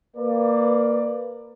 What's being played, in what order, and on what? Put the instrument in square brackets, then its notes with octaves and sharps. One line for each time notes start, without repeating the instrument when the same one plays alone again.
[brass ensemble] A#3 B4 D5